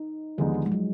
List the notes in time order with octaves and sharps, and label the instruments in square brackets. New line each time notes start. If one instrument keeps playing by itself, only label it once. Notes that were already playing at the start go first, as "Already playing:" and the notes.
Already playing: [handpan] D#4
[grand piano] D#2 D3 G#3 B3 D#4 [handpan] F3
[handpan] F3
G#3
F#3